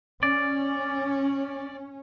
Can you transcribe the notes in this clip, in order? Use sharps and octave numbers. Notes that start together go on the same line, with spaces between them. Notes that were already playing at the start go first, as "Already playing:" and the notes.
C#4 D5